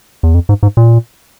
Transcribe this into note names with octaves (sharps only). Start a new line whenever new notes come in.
E2
F2
G#2
G#2
A#2